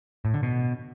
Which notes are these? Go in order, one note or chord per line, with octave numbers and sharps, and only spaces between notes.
A2
D3
B2